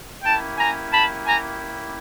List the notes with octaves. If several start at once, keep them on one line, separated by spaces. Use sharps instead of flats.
A#3 C#4 E4 G4 G5 A5
G#5 A#5
A5 B5
G#5 A#5